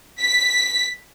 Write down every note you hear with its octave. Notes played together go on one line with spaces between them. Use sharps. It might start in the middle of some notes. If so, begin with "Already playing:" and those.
B6